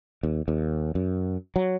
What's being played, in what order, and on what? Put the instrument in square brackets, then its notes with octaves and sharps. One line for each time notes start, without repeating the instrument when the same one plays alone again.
[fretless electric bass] D#2
D#2
F#2
F#3